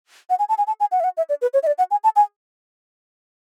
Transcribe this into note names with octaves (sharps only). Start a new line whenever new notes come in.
F#5
G#5
A5
G#5
A5
G#5
F#5
E5
F#5
E5
D5
B4
C#5
E5
D5
F#5
G#5
A5
G#5